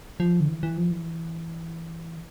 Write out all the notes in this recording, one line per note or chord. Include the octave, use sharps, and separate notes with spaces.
F3
D3
E3
E3
F3
E3